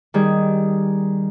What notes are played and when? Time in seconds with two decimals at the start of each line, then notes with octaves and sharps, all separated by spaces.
0.14 D#3 G3 G#4